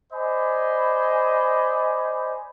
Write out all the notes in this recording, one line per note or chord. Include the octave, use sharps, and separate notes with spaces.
C5 D5 D#5 G#5 B5